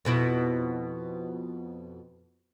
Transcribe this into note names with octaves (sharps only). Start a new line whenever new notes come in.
F2 B2 E4